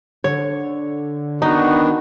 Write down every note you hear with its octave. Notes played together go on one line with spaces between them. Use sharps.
D3 C#5
D#3 B3 D4 D#4 F#4